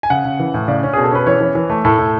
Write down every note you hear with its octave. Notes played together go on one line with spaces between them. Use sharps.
G#5
C#3 F#5
C#3
E3
A2
C#3 D5
C#4
B2 G#4
A4
C#4 B4
E3 C#5
E3
E3
A3
A2 A4
A2